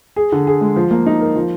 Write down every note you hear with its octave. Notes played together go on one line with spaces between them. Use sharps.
G#4
D3
G#4
G#3
F3
A#3
D#4
A#4
F3